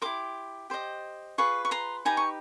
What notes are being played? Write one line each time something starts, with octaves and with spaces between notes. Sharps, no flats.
E4 G4 A#4 C6 D6
G4 C5 D#5
F4 G#4 B4 C#6
C#6
A#5 C6
D#4 G4 B4 G#5 A#5
C#6